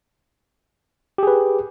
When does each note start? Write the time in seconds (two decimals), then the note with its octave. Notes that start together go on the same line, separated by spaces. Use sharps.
1.18 G4
1.23 G#4
1.27 B4